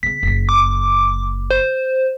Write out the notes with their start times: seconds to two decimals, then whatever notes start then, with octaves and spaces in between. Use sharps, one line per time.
0.03 C#3 B3 B6
0.23 F#1 C#3
0.49 D6
1.51 C5